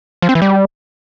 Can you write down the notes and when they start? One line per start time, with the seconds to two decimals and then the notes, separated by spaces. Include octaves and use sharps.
0.22 F3
0.29 C4
0.35 E3
0.42 G3